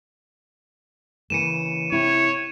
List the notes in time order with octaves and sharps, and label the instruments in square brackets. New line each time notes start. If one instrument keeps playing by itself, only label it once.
[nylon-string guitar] C#3 E3 A#3 [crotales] C#7 D#7 E7
[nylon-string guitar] C3 E4 [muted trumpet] C#5